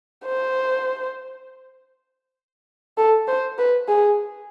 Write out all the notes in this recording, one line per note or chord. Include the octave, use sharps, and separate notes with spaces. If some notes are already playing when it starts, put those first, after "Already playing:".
C5
A4
C5
B4
G#4